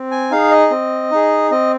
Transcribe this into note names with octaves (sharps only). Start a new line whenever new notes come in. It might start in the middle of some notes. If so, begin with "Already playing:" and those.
Already playing: C4
G#5
D#4 G#4 F5
D#5
C4
D#4 G#4
C4 D#5